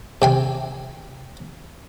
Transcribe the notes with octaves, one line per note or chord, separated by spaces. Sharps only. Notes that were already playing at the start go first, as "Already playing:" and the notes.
C3 G5 G#5